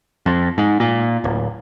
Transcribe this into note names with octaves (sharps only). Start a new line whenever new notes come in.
F2
G#2
A#2
D1